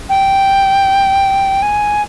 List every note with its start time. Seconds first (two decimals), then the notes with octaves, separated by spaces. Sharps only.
0.09 G5
1.62 G#5